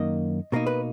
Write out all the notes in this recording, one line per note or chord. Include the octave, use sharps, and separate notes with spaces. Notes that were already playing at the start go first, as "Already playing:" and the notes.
Already playing: F#2 D#3 A#3 D#4 D#5
B2 A#3 D#4 A#4
B4